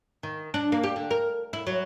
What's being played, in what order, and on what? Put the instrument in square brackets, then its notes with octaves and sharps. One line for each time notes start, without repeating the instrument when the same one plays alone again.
[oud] D#3
D4
A#3
G4
D3
A#4
E4
F#3